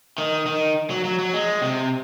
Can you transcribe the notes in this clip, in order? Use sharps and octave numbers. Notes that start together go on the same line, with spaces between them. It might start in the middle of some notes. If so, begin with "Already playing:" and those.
D#3
D#3
F#3
F#3
F#3
G#3
C3